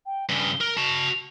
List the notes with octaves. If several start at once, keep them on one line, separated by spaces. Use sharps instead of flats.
G5
G2 C#3 G7
A#4
F#4 A5 F7